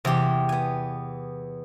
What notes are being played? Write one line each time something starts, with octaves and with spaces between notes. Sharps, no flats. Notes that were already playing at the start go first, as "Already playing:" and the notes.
E2 C3 G4
B3 G#5